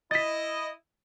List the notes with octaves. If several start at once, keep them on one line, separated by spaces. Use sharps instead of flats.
E4 D#5 A6 B6